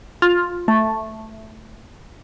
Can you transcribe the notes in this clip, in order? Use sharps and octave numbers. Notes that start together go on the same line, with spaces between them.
F4
A3